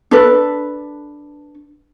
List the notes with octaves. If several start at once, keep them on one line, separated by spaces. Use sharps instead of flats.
D4 A4 B4